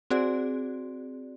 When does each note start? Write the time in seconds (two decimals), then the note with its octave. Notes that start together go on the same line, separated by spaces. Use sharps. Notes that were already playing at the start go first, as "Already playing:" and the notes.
0.10 C4 F#4 G#4 D5